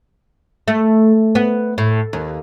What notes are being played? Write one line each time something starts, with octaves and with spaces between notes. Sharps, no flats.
A3
B3
A2
D#2